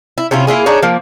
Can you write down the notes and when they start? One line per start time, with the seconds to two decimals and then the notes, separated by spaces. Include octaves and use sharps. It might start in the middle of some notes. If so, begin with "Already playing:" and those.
0.18 E4
0.31 C3 C#4 E4 F4
0.47 A#3 E4 F4 G#4
0.66 D4 D#4 G#4 C#5
0.83 F3 A#3